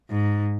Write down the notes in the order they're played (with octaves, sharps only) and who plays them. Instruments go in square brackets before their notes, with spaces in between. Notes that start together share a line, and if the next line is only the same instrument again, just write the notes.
[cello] G#2